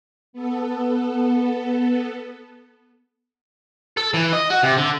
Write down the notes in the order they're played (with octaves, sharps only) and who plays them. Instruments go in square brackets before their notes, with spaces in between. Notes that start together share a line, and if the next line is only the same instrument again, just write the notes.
[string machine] B3 A4
[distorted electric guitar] A4
E3
D#5
F#4
C3
D3